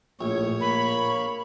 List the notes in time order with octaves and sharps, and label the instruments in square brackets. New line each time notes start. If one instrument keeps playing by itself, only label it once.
[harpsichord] A#1 [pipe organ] A2 [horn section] C#5
[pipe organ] A#3 [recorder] B5